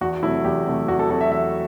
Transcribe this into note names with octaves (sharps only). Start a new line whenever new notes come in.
E2 F#4
C3 F#3 A3 E4
E2 G4
C3 F#3 A3
E2 F#4
A4
C3 F#3 A3 A4
E5
E2 E5